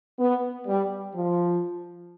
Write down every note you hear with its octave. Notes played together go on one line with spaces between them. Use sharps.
B3
G3
F3